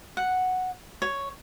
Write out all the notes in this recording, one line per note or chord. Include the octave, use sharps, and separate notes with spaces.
F#5
C#5